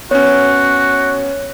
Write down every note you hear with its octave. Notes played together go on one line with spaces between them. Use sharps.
B3 C#4 F#4 C#5